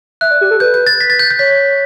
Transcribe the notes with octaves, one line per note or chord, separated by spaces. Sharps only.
E5 F#6
D5
G4
A4
B4 G6
G6
A6
B6
A6
G6
G6
C#5 B6